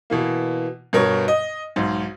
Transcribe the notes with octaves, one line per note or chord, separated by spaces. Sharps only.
B2 E3 A#3
G2 B2 A#4 C#5
D#5
B1 G#2